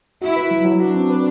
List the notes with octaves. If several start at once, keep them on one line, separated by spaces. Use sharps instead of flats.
E4 F#4
B4
F#3
F#3
D4 F#4
C4
B4